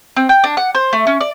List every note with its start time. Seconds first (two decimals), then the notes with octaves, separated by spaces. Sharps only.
0.16 C4
0.29 G5
0.44 D4
0.57 F#5
0.75 C5
0.93 A3
1.07 C#4
1.21 D5